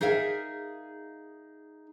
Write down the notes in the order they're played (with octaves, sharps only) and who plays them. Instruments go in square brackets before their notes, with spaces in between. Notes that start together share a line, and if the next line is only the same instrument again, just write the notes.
[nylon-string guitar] D#4 G#4 A#4 E5 F5